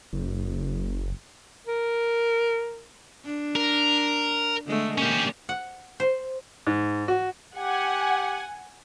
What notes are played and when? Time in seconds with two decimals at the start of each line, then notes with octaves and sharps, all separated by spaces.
0.13 F#1
1.67 A#4
3.25 D4
3.56 A#4
4.66 D3 G#3 A3
4.98 A#3 C#4 G4
5.49 F#5
6.00 C5
6.67 G#2
7.08 F#4
7.56 G4 F#5 G#5